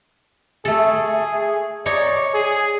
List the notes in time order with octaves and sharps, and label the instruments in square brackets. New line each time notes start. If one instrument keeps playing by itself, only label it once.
[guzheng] A3 A4 [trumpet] G#4
[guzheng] D#4 C#5 [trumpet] D5
[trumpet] G#4